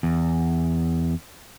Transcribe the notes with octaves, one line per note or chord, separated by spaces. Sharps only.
E2